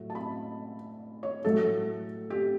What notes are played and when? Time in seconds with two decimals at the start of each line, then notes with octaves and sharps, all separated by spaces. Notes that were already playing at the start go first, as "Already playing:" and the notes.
Already playing: A2 F#3 A3
0.10 A5
0.15 B5
1.23 C#5
1.44 A2 F#3 A3 A4
2.30 G4